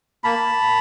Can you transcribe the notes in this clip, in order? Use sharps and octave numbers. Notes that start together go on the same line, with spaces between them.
A#3 A5 B5